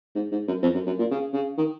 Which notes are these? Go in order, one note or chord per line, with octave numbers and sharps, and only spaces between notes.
G#2
G#2
F#2
F2
F#2
F#2
A#2
C#3
C#3
D#3